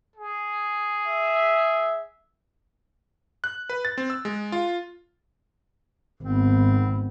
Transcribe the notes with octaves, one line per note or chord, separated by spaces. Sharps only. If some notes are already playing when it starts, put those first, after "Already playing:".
G#4
E5
F#6
B4
A6
C4
E6
G#3
F4
G#1 B3 C4